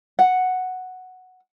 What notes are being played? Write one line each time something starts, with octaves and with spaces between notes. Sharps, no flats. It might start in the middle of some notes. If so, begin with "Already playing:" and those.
F#5